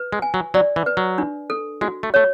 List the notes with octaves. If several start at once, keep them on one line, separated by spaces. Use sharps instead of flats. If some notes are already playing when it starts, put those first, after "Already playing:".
Already playing: B4
G#3
G#5
F#3
F#3 D5
E3
B4
F#3
D4
A4
G#3 F#4
A3
A3 C#5